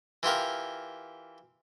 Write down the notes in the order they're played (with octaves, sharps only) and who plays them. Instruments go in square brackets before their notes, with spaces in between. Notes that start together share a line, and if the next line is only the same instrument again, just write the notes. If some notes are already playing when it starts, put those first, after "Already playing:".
[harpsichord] E3 F4 G4 A#4